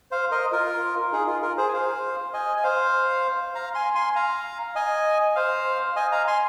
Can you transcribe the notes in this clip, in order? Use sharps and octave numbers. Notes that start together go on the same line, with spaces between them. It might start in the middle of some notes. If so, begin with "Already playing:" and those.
C5 F5
A#4 D#5
F4 A#4
D#4 G#4
F4
F4 A#4
G#4 C5
G#5
C5 F5
D#5 G#5
G#5
C5 F5
F5 A#5
G#5 C6
G#5 C6
F5 A#5
D#5 G#5
C5 F5
D#5 G#5
F5 A#5
G#5 C6